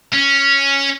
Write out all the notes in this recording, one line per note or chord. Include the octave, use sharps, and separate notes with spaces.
C#4